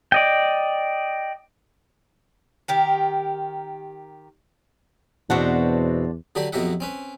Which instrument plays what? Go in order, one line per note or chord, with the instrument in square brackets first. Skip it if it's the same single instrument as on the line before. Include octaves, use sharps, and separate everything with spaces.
[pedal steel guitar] D5 D#5 G5
[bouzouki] D#3 G4 A#4
[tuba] E2 [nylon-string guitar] B2 C4 F#5 [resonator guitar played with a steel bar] D4 F#4 C5
[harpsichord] D3 F#3 D4 G4 B5
F2 B2 F#3 G4 E5 F#5
C4 C#4 B4